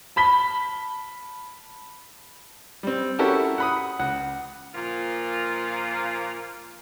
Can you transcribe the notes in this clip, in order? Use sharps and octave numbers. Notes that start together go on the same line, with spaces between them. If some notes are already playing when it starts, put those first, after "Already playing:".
A5 B5 B6 G7
G3 C4
C#4 E4 F#4 G4 A4 A#4
F#5 B5 D#6
C#2 F#5
A#2 F3 A#3 F4